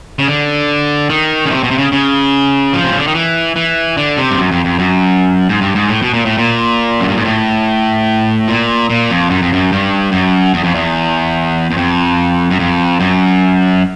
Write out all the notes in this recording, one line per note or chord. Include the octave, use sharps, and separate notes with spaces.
C#3
D3
D#3
C#3
C3
B2
C3
C#3
C#3
F3
C3
C#3
D3
D#3
E3
E3
D3
C3
G2
F#2
F2
F2
F#2
G#2
G2
G#2
A2
B2
A#2
A2
A#2
F#2
G2
G#2
A2
A#2
A#2
F2
F#2
F2
F#2
G2
F#2
E2
F2
E2
E2
F2
F#2
F2
F#2